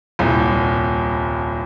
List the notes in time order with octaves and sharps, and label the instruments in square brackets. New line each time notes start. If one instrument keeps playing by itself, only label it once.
[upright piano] D#1 C2